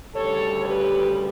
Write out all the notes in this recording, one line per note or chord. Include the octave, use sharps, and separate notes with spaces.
D2 C#3 G3 A4 C#5
G4 B4